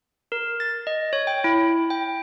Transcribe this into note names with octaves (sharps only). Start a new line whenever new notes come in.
A#4
A6
D#5
C#5
G5
E4
G5